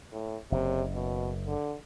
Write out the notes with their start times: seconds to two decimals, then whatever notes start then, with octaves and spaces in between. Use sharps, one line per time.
0.12 A2
0.52 F#1 C3
0.94 B2
1.47 D3